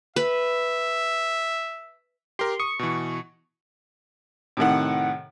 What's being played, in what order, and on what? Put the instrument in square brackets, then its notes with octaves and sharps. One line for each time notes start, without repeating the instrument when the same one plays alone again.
[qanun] B4 [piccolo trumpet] E5
[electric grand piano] G4 A#4 [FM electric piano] C6
[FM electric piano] C#6 [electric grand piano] D#6
[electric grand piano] B2 E3
[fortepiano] A2 C3 D#3 F#5